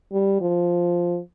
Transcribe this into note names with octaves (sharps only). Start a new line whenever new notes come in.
G3
F3